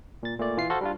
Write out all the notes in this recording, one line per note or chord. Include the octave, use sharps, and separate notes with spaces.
A#2 A6
A#2 A3 D5
E3 F4 C7
F#4 A4 C5 F5 C6
G3 D4 F4